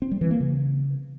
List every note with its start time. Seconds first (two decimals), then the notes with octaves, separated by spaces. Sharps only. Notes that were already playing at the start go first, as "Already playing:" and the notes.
0.02 C4
0.11 G3
0.21 E3
0.31 A#3
0.40 C#3